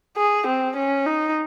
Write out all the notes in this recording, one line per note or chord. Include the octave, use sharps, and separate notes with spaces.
G#4
C4
C#4
D#4